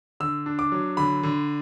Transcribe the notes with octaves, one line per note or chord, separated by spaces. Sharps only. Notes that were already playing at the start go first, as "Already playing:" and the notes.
D3 E6
D4
D6
F#3
D3 B5
D3